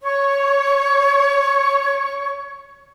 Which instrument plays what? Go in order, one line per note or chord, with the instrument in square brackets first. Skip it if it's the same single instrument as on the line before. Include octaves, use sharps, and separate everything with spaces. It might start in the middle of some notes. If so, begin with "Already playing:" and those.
[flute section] C#5 C#6